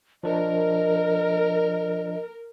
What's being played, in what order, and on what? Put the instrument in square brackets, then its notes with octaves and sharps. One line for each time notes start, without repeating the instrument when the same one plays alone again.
[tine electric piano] F3 D4 [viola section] A#4 [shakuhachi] D#5